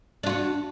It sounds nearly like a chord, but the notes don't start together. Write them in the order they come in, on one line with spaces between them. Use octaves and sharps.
D4 F4 F#4